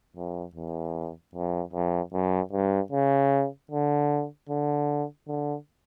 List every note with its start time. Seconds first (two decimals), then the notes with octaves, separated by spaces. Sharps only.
0.17 F2
0.55 E2
1.35 F2
1.73 F2
2.13 F#2
2.53 G2
2.92 C#3
3.71 D3
4.49 D3
5.28 D3